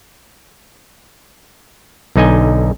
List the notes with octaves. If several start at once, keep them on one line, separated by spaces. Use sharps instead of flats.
B1 D3 D#4 D#5 G#5